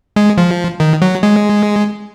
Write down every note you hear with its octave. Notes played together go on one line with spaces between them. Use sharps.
G#3
F3
D#3
F#3
G#3